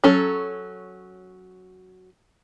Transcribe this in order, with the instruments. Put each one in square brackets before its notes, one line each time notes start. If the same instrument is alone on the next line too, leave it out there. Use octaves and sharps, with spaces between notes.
[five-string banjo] F#3 C#4 A4